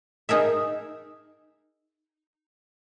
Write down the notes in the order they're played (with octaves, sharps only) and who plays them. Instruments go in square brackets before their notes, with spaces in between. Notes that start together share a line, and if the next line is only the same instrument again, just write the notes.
[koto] D#4 G#4 A#4 E5